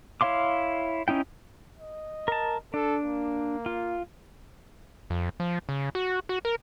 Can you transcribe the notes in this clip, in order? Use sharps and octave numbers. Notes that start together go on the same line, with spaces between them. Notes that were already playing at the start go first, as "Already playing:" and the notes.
E4 C#5 F5 C6 D6
C#4 D#4 E4 G5
D#5
A#4 A5
D4 A4
A#3
F4
F2
F3
C#3
F#4
F#4
A#4